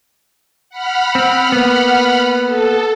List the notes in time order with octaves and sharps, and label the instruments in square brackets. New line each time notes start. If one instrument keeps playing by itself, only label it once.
[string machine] F#5 B5 F6
[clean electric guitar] C4
A#3 B3
[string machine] A4